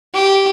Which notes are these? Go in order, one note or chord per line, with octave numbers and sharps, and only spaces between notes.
G4